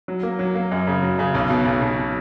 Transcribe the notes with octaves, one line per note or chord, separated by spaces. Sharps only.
F#3
A#3
F#3
A#3
F#2
C#3
F#3
C#3
B1
B2
B1
B2